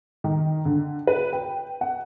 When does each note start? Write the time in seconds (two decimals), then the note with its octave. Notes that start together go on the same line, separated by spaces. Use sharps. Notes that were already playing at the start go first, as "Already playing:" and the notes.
0.24 D#3
0.65 D3
1.07 B4
1.33 G5
1.81 F#5